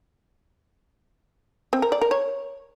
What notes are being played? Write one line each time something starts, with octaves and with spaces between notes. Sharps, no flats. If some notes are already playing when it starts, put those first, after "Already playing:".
C4
A#4
D5
A#4
C#5